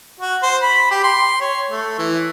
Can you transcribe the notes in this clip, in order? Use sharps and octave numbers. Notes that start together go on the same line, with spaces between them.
F#4
C5
B5
G4
C6
C#5
A3
E3